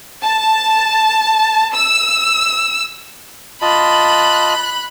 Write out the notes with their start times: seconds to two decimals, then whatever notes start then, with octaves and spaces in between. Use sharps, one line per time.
0.22 A5
1.73 E6
3.62 F4 D#5 A5 B5 F#6